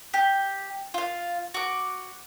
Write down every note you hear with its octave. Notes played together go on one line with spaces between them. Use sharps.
G4
F4 F5
F#4 D6